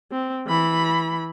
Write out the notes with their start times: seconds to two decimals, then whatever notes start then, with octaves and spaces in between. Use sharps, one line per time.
0.12 C4
0.47 E3 B5